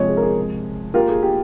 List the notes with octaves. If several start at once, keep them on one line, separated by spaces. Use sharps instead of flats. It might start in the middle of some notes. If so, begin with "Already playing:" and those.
Already playing: C3 F3 G#3 C#5
G#4
A#4
G#4
A#3 F4 G4 A#4
G#4
G4